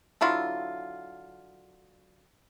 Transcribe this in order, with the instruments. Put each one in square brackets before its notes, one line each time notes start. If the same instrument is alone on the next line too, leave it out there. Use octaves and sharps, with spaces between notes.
[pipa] D3 F#3 E4 F4